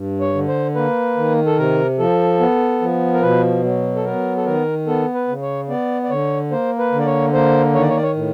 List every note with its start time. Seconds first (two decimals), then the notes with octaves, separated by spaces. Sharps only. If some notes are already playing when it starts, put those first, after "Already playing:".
Already playing: G2
0.20 C#5
0.34 D3
0.48 C5
0.75 A#3 B4
1.17 D#3
1.46 A4
1.58 C3 A#4
1.99 F3 A4
2.40 B3
2.81 F3
3.14 A#4
3.22 B2 B4
3.64 F#3
3.96 A4
4.05 B3 A#4
4.37 A4
4.46 D#3 A#4
4.87 B3 A4
5.14 B4
5.28 C#3
5.42 C#5
5.69 B3 D5
6.04 D5
6.10 D3 C#5
6.51 A#3 C5
6.79 B4
6.92 D3
6.99 D5
7.06 C#5
7.33 A#3 C5
7.75 D#3 C#5
7.82 D5
7.89 C#5
7.96 D5
8.03 C#5
8.16 A2